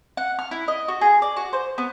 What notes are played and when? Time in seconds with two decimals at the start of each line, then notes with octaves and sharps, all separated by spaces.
0.17 F#5
0.39 F6
0.51 E4
0.68 D#5
0.88 F#4
1.01 G#4
1.22 D5
1.37 F#4
1.53 C5
1.78 B3